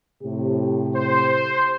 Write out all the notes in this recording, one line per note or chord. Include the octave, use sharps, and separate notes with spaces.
A2 C3 G4
C5